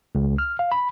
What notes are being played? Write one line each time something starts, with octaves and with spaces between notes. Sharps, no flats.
C#2
F6
F5
B5